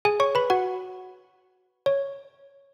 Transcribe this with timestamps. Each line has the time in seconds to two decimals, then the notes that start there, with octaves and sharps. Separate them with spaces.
0.05 G#4 G#5
0.20 C#5 C#6
0.35 B4 B5
0.50 F#4 F#5
1.86 C#5